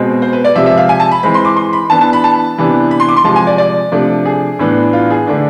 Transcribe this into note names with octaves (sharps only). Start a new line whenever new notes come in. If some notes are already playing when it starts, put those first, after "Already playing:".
Already playing: B2 G#3 C4
C5
B4
D5
C3 F3 G#3 E5
E5
F5
G#5
A5
B5
E3 G#3 C4 B5
C6
D6
C6
B5
E3 B3 D4 A5
A5
B5
A5
C3 E3 B3 D4
B5
C6
D6
C6
C3 F3 G#3 A5
G#5
D5
D5
C3 F3 A3 D4
G#4
A2 E3 B3 D4
F4
G#4
D3 A3 D4